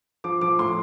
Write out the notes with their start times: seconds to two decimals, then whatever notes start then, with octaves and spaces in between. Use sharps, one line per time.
0.24 F3 D6
0.41 F3 D6
0.59 A2 C6